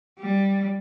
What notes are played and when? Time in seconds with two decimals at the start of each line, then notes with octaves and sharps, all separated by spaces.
0.19 G3